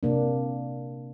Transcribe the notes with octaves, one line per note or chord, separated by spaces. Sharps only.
C3 A#3 D4